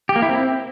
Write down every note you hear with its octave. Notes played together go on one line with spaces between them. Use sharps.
G4
A#3
E4
C4